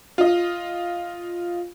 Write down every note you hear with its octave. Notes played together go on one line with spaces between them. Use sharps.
F4 D#5